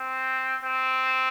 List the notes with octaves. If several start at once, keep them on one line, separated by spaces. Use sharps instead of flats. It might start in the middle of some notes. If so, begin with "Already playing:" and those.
Already playing: C4
C4